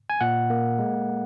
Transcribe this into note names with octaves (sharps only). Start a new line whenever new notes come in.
G#5
A#2 F#5
A#3
G#3